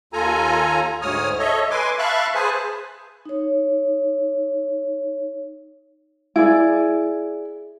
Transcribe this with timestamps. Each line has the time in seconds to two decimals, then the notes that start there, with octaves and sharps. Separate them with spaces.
0.13 D#2 F4 A4 G#5 A#5
1.02 D2 G#2 C#5 D#6 F6
1.39 A4 C#5 D#5 E5
1.71 B4 G#5 C6 D6
1.98 E5 F5 A5 B5 C#6 F#6
2.35 G#4 B4 C5 G#5 A5
3.25 D#4 C#5
6.36 E4 G#4 D5